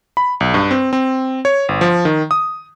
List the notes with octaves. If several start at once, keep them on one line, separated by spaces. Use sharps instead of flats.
B5
B1
G2
C4
C4
C#5
G1
F3
D#3
D#6